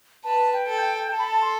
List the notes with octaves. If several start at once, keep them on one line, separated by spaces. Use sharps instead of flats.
B4 A5
G5
A4
G5
A4 A5
B5
A5
C6